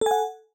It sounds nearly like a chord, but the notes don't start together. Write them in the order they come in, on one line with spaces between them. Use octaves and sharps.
A4 G#5 F#5